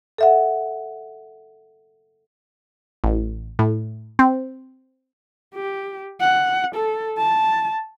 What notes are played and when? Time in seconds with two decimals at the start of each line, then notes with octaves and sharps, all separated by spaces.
0.18 A4 E5 F#5
3.04 A1
3.59 A2
4.19 C4
5.54 G4
6.20 F#5
6.75 A4
7.18 A5